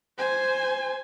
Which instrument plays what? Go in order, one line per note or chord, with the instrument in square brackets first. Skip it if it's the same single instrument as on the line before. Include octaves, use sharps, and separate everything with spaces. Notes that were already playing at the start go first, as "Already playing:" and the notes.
[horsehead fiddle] C5 G#5